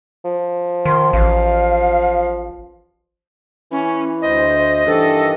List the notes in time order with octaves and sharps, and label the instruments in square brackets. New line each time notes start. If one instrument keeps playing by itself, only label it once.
[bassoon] F3
[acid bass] D#3 [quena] C6
[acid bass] A1 [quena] F5
[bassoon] E3 [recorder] C#4
[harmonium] D2 C5 [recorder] D#5
[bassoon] G2 [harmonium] D#3 E3 [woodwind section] D4 A4